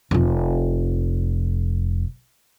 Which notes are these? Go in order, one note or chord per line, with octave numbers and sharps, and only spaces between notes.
F1 F4